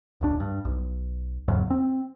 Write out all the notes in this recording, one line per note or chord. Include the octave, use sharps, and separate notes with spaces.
D#1 C#2 D4
G2
B1
E2 G#2 C#3 F#3
C4